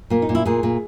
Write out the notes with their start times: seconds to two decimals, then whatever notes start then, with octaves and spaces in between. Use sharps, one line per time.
0.10 A#2 A#3
0.22 D#4
0.29 A#2
0.35 E4
0.46 A#2 G#4
0.63 A#2